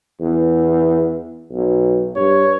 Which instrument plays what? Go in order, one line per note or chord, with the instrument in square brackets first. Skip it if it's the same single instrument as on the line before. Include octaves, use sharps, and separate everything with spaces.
[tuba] E2
B1
[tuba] G2 [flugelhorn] C#5